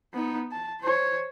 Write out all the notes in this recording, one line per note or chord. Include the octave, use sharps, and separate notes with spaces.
B3 D#4
A5
C5 C#5